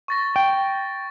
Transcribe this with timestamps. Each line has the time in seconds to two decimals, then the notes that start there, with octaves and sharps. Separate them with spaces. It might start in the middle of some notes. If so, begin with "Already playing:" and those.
0.08 C#6 A6 A#6
0.36 G5